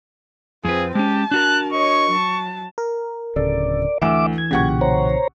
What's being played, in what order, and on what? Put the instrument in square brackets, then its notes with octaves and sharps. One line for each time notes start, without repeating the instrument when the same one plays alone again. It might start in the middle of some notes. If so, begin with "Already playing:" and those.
[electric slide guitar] F2 B4 [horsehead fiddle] C4 F4 [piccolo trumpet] G#4
[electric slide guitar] G#3 C#4 [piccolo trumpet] G4 [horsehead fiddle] A5
[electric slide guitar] D4 F#4 A#4 [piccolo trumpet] F#6
[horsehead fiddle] C#5 D#5 [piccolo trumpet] C#6
[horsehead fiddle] F#3 A5
[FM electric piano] A#4
[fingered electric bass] D1 C#3 [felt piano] A4 [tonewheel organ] D5
[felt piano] D2 E7 [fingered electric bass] E3 [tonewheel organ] E5 D6
[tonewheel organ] G#6
[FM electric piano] B1 A#2 C#3 [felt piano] G4 F#5 C#6
[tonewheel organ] C5 C#5 A#5